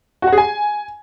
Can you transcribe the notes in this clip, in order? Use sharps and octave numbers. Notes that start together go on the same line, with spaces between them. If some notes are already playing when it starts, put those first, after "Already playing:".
F#4
F#5
G#4
G#5